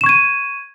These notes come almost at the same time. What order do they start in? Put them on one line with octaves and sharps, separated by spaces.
E7 C#6 G#6 D#7